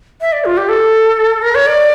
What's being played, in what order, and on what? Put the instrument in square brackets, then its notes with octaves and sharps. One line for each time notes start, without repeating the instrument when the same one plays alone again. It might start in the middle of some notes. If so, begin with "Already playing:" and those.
[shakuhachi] E5
D5
F4
G4
A4
A#4
C#5
D5